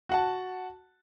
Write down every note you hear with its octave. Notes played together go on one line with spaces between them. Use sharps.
F#4 F#5 A5